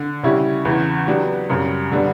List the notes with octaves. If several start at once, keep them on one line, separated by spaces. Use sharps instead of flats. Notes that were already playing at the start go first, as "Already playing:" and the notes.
Already playing: D3
C#3 G3 C#4 E4 G4
E2 C#3 E3
F#3 B3 D4 G4
F#2 C#3 G3
D3 G3 B3 D4